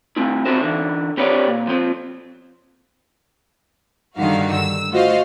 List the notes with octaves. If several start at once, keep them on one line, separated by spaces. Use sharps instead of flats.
A3 C4 E4
C4 D#4 E4 F#4 A#4 C5
D3 E3
C4 G4 A#4 B4 C#5 D5
A#2
F3 C4
G2 D3 D#3 D#4 F#4 F5
E6
A3 F4 F#4 C5 D#5 F5